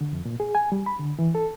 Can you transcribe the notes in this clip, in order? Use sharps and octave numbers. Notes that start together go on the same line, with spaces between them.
D3
F2
A#2
G#4
G#5
G3
B5
D3
E3
A4